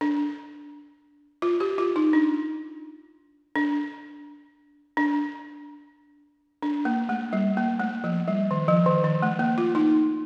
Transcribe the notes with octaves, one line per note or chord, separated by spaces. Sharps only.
D4
F4
G4
F4
D#4
D4
D4
D4
D4
A#3
A3
G3
A#3
A3
F3
G3
D#3
F3
D#3
D#3
A3
A#3
F4
D#4